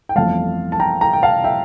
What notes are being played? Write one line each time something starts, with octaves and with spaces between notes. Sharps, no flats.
G5
G1 F2 E3 A3 F5 A5
A5
G5 A#5
G5 A#5
G5
F5 A5
E5 G5